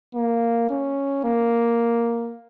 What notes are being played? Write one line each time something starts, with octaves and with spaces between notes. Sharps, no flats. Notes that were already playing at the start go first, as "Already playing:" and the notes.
A#3
C#4
A#3